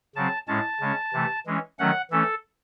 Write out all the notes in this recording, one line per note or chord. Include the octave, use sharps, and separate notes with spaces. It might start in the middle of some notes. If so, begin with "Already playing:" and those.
C#3 F#3 C4 A5
A2 G#3 C#4 A5
C#3 G#3 C#4
C3 E3 A3
E3 G#3 C#4
D#3 F#3 A3 C#4 F#5
E3 A3 C#4 A4